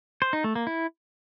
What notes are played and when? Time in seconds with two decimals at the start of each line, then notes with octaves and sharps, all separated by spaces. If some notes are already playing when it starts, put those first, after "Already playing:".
0.22 C5
0.33 D#4
0.44 A3
0.55 A#3
0.67 E4